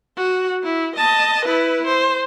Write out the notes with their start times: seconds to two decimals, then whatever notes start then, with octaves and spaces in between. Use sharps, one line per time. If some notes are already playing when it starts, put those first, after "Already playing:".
0.17 F#4
0.63 E4
0.96 D#5 A5
1.45 E4 B4
1.87 C5